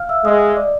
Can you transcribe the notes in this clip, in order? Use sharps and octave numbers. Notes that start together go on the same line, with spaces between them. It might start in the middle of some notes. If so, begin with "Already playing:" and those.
Already playing: F5 F6
E5 E6
G#3 D#5 D#6
D5 D6